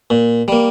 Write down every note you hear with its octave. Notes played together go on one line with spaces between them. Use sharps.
A#2
G3 A#3